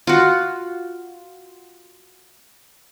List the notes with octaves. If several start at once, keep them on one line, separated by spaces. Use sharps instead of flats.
F4 F#4